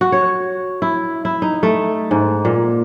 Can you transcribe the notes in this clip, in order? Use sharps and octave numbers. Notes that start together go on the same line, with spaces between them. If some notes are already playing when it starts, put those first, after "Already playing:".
F#4
C#5
E4
E4
D#4
A3
G#2
A#2